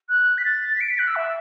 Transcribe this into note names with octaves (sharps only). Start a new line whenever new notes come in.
F#6
B6
A6
B6
D7
B6
F#6
E6
E5